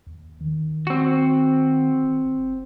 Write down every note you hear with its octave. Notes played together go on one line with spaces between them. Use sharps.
D#2
D#3
C4 F#4
G1
F#1